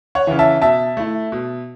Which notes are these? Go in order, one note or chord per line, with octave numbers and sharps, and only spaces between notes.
C#5 F#5
C#3 E3
E5 A5
B2 E5 A5
A3 E4
B2